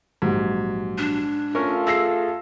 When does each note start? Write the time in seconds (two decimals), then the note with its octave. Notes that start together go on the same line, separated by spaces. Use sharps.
0.22 A#1 G#2 F#3 G4
0.98 D4
1.55 A3 C#4 F4 A4 A#4 C#6
1.87 G#4 E6 A#6 C7